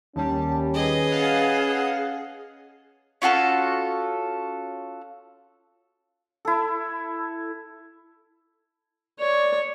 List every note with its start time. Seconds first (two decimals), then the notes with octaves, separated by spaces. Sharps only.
0.16 D#2 G3 C#4 A5
0.74 G#4 B4 D#5
1.12 F5 F#5 A5
3.22 C#4 F4 F#4 A4
6.45 E4 A4
9.19 C#5 D5